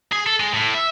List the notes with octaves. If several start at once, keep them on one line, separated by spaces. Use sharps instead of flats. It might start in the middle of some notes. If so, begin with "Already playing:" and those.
G#4
A4
G#3
A2
E5